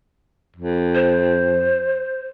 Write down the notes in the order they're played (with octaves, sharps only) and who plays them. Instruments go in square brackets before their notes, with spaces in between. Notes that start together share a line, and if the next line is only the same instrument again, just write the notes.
[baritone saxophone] F2
[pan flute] C5